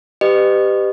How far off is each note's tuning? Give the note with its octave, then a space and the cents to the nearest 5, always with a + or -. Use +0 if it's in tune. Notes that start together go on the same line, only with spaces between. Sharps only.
G4 +0 B4 +35 D#5 -35